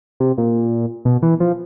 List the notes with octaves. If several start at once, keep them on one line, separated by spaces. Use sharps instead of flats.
C3
A#2
B2
E3
F3